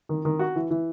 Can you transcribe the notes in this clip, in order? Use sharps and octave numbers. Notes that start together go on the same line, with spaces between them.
D#3
D#3
F#4
E3
E3